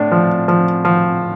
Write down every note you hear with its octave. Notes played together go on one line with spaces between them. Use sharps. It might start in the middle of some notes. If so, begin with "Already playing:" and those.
Already playing: A2 D4
F3
F3
F3